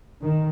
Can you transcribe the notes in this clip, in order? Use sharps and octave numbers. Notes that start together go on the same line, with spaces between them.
D#3